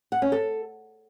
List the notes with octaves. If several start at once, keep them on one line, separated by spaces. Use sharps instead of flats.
F#5
C#4
A4